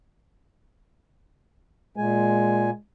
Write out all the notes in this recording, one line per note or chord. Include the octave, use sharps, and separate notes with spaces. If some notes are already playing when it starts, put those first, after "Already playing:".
A#2 G#3 G#5